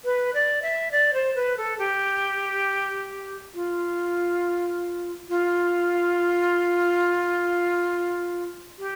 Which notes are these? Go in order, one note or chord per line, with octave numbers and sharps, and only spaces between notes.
B4
D5
E5
D5
C5
B4
A4
G4
F4
F4
G4